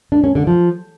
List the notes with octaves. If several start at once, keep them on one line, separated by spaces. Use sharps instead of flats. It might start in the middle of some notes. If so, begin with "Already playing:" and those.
D4
C#4
D3
F3